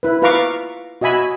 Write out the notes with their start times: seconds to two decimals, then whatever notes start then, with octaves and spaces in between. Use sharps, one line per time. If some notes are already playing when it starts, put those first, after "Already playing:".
0.03 E4 B4
0.22 F4 B4 F5 A#5 C#6 D6
1.01 F#4 D#5 E5 G#5 B5